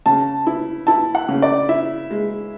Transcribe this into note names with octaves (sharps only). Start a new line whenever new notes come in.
C#3 A5
E4
E4 A5
F#5
C#3
D5
E4 E5
G#3